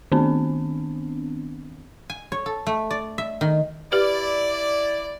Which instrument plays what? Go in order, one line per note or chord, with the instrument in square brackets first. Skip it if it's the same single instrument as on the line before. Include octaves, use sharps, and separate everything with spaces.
[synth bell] D#3 B3 C4 D4
[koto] G#5
C#5
A4
A3
D5
E5
D#3
[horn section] E4 D5 [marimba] G4 B4